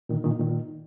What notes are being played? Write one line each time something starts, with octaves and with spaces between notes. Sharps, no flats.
A#2 D#3
A#2 D#3
A#2 D#3